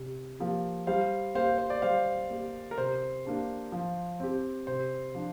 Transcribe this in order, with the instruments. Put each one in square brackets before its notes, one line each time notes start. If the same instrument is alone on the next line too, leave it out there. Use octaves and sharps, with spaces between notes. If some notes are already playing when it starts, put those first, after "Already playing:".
Already playing: [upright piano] C3
F3 A#3 G4
[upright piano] G3 [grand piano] C5 F5
[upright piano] A#3 G4 [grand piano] C5 F5
[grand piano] C5
D5
[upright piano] G3 [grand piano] C5 F5
[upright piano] A#3 G4
[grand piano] A#4
[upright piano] C3 [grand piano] C5
[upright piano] A#3 D4 G4
F3
C4 G4
[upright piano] C3 [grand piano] C5
[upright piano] F3 D4